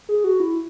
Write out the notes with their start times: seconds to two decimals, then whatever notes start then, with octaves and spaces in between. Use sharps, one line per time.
0.09 G#4
0.24 F#4
0.40 E4